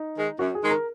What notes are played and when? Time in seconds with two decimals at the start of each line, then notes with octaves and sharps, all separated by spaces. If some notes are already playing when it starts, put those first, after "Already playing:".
Already playing: D#4
0.16 D#3 G#3
0.39 F#2 F#4
0.55 G#4
0.63 D#3 G#3
0.70 A#4